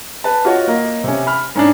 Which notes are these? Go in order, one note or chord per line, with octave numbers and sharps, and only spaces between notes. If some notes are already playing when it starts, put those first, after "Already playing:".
B4 A5
F4 F#4 C#5 D#5 F#5
A#3 A#4 D#5
C3 C#4
B5 F6
G#2 C#4 D4